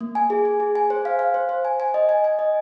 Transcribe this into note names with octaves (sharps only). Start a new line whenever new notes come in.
A#3
G#5
G#4
G#4
G#4
G#5
C5
F5
F5
C5
C5
G#5
G#5
D#5
G#5
G#5
D#5